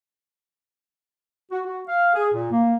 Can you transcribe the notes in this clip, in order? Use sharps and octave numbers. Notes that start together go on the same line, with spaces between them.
F#4
F#4
F5
G#4
A#2
A#3